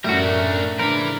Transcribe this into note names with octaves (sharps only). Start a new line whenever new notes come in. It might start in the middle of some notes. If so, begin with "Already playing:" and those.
F#2 A2 G3 D4 F#4 A#4 E5
A3 C#4
C#3 F3 D4 E4 A#4 B4